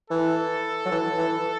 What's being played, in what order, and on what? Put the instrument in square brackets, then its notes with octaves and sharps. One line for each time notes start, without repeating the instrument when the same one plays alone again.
[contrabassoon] E3 [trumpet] A4
[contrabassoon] F#3
E3
E3